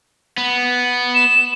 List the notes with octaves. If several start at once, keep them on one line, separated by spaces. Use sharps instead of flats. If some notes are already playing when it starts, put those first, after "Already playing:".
B3
E7